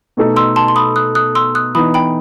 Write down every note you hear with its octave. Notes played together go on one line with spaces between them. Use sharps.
B2 A3 D#4 A4
C6 E6
A5 C6
C6
B5 D#6
D#6 F#6
D#6 F#6
C6 E6
D#6 F#6
E3 B3 D#4 B5 D#6
G5 B5